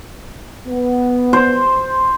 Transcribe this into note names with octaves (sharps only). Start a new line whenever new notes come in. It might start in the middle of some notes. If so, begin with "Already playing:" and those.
B3
C5